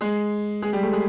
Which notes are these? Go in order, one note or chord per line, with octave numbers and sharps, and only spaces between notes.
G#3 G#4
G#3 G#4
G3 G4
A3 A4
G#3 G#4